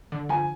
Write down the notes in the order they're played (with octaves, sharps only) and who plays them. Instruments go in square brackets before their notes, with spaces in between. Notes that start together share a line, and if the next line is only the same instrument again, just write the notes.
[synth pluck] D3
[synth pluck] F3 [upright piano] G#5